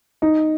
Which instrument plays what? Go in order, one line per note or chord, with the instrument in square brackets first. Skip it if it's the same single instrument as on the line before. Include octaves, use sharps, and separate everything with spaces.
[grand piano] D#4